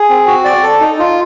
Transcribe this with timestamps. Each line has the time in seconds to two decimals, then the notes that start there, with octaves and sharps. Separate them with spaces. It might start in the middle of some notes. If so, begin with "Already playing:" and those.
Already playing: G#4
0.09 C4
0.27 F#4
0.45 D5
0.63 A4
0.80 D#4
0.99 F4